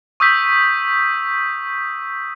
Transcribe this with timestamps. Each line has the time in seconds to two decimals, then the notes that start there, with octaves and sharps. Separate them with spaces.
0.20 C#6 D#6 E6 G6 B6